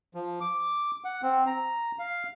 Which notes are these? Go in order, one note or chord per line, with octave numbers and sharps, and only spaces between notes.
F3
D6
F#5
C4
A#5
F5